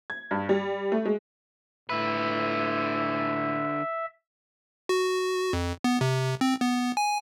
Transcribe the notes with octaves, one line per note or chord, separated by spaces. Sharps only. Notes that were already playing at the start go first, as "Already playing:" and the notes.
G#6
G2
G3
A3
G#3
A2 D3 B4 E5
F#4
F2
B3
C3
C4
B3
G#5